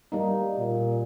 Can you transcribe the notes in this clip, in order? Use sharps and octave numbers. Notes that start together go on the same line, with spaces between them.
G3 A#3 D#4
A#2